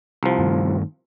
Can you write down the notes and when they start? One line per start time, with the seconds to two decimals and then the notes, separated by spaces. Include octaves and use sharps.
0.23 C2 F3
0.39 G2 D#3 A3